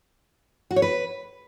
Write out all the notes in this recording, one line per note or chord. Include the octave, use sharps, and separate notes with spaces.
F#4
C#5
B4